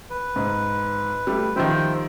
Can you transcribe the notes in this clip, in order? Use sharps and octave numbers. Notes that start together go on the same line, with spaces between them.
B4
G#2
G3 A3
D#3 F3 G3 C5 E5 G5